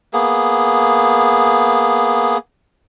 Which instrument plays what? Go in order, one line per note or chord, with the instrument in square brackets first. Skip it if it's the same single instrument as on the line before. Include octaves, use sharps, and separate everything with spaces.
[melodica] A#3 B3 G#4